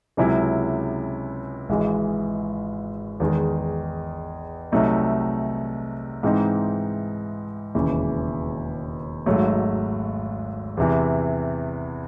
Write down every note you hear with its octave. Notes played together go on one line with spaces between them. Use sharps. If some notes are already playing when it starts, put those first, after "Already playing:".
C#2 C3 F#3 C#4 E4
G#1 G#2 E3 G#3
E2 D#3 G#3
C2 C3 F#3 A3 D#4
G#2 E3 C4 D#4
E1 D#2 C#3 E3
G#1 G#2 F#3 A3
E2 C3 E3